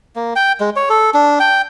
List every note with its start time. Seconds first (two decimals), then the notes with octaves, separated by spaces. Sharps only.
0.16 A#3
0.36 G5
0.60 G#3
0.76 C#5
0.90 A4
1.14 D4
1.40 G5